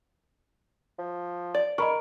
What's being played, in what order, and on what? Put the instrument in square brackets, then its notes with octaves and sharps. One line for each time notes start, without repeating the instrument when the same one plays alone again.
[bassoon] F3
[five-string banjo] D5
[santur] A#4 [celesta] D#5 B5 C#6